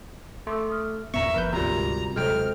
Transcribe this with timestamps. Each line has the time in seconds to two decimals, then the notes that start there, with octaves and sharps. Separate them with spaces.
0.47 A3 C6 D6 E6
0.70 D#6 F6
1.14 E2 A#2 B3 E5 A#5 C#6
1.34 F#1 F3 B3 A#4 B4 G6
1.52 D2 G#2 C3 G3 F4 F#4 A#4 A#5
2.16 D#1 C3 F#3 G#3 A4 C5 G5 F6